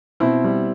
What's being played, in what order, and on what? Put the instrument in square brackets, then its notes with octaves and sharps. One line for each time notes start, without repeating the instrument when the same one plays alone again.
[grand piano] B2 C4 E4
G3